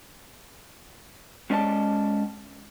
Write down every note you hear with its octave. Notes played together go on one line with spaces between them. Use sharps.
G#3 C#4 D5 D#5 A5